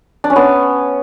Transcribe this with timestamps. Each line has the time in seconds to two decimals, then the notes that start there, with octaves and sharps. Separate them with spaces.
0.24 D4
0.30 C#4
0.36 B3